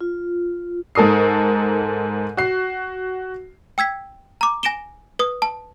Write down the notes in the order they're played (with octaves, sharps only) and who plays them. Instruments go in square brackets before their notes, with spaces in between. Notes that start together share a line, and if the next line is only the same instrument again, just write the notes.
[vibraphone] F4
[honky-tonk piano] G#2 A4 A#4 D#6 C7
F#4 C7
[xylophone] G5 E6 G#6 B6
A#5 D6
G#5 A#6 D7 E7 G7
B4 D#6
A5